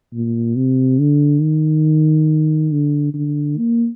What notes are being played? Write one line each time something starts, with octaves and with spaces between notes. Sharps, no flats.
A#2
C3
D3
D#3
D3
D3
A#3